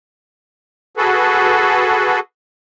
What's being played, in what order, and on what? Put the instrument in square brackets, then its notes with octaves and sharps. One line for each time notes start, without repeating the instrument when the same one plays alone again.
[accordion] F#4 G#4 A4 B4